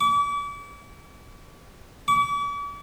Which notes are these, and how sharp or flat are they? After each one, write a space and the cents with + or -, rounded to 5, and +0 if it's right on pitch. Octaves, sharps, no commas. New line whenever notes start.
D6 -40
D6 -45